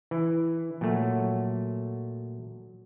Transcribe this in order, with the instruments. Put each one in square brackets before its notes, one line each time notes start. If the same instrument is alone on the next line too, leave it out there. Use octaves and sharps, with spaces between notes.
[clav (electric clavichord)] E3
[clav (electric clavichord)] A#2 A3 [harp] F#3